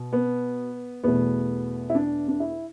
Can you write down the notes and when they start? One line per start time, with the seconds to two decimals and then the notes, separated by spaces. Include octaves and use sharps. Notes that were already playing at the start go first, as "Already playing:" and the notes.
Already playing: B2
0.13 B3
1.04 E2 B2 A3 B3
1.90 E4
1.95 D4
2.28 D4
2.40 E4